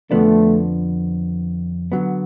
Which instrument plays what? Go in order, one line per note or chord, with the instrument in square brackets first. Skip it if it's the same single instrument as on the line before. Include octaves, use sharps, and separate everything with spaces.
[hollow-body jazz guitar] F2 D3 F3 B3 D4 [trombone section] A3
[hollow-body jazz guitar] D3 F#3 B3